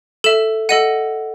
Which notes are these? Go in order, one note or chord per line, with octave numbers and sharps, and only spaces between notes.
A4 E5 E7
A4 D#5 F#5 D#7